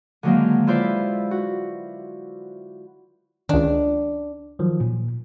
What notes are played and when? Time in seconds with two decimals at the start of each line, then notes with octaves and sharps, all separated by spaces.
0.23 D3 D#3 F#3 G#3 A#3
0.67 E4 F4 B4 C5 D5 E5
1.31 F#4
3.49 C#2 D#3 D4
4.59 D#3 F3 F#3
4.80 A#2